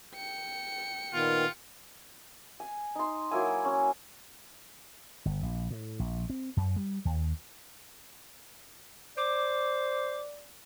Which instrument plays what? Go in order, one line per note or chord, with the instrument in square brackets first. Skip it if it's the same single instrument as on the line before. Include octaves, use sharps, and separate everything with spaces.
[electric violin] G5 C#7
[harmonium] A#2 D#3 B3 [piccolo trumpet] F4
[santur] G#5
D#4 C6
F#3 A#3 E4 G#5
C#4
[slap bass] G1
A#1
A2
A#1
C4
F#2
G3
D#2
[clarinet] C5 [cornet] D5 [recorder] D6